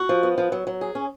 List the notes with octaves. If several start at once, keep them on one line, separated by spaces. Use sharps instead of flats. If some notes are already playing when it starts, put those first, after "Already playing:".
Already playing: F#4
F3
B3
F3
F#3
F#3
G#4
C#4